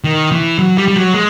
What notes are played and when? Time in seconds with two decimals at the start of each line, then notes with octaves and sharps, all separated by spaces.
0.04 D#3
0.32 E3
0.59 F#3
0.78 G3
0.88 G3
0.96 F#3
1.14 G#3